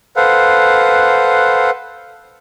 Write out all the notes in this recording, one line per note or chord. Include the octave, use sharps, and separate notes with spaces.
A4 B4 C5 F5 F#5